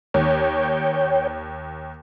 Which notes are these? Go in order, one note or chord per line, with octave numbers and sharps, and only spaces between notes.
D#2 C#5 G5